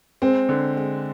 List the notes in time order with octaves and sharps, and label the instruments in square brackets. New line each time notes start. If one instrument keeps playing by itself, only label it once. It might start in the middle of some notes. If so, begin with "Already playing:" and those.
[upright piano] G#3 [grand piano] C4
[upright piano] D3
G#3